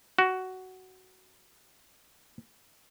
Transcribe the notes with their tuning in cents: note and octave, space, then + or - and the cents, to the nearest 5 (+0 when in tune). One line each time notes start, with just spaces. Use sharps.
F#4 +10